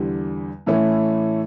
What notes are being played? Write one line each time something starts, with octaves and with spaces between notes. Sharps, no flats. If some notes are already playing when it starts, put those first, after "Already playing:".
Already playing: E2 D3 G3
A2 E3 A3 C#4 E4